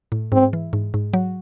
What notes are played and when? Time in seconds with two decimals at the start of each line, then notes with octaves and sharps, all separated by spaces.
0.12 A2
0.32 G#2 C4
0.53 E3
0.73 G#2
0.94 G#2
1.14 F#3